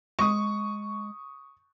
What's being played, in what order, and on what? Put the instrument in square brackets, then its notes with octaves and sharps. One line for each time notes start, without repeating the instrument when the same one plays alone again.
[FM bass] G#3 [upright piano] C#6 D#6